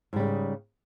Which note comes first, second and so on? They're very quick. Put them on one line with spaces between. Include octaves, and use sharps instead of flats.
G#2 G3 C#3